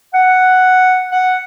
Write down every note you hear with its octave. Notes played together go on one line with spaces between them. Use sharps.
F#5
F#5